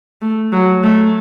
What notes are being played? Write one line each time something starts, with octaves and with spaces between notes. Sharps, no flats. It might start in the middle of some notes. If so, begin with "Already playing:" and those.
A3
F#3
A3